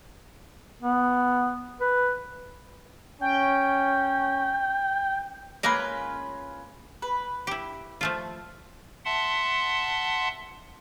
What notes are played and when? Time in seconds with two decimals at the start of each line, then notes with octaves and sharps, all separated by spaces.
0.82 B3
1.81 B4
3.21 C#4 G5
5.63 G#3 A#3 C#4 F4 A#4 B4
7.02 B4
7.47 E4 G4
8.01 F3 A3 F4
9.05 E5 F#5 A5 C6